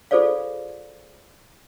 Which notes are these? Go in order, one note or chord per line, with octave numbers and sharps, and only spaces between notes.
F4 G#4 A4 C5 D5 F5